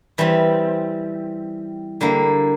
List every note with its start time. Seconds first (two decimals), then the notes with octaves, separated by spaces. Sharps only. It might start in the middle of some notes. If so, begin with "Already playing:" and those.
0.18 E3 G3 C4
2.01 D3 G3 A#3